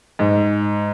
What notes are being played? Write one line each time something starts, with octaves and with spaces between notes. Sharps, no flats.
G#2